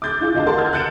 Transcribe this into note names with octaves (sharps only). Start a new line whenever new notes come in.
D6 F#6 G6 A6
E4 F4 G#4
D2 D#5 F5 A5
A#4 F#5 A5 C6
F6 G6 G#6
F#6 G6 A6 C#7 D7 E7